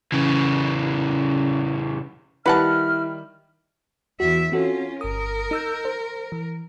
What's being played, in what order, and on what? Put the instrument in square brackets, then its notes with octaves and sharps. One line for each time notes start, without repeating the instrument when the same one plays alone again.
[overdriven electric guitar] C#3 E3
[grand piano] D#3 G3 [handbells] E4 E5 [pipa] B4 F#5 A5 [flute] F6
[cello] E2 E5 [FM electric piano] F#4
[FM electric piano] C4 F#4 A4 [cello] C#4 F4
[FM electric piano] G1 D#6 [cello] A#4
[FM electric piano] D#4 E6 G6
C5
E3